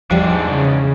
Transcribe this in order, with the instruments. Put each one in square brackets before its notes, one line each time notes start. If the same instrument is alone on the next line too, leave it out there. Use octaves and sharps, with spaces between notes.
[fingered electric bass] E2 E3 [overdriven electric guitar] G#2 D4 [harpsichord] F3 G3
[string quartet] C#3